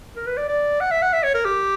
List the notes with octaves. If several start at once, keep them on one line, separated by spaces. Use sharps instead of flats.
A#4
B4
D5
D5
F#5
E5
F#5
E5
C#5
A#4
G4